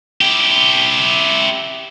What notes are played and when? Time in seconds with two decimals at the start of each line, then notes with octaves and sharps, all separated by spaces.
0.21 E4 G4